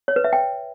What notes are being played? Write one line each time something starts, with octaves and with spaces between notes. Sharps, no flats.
C#5
B4
E5
G5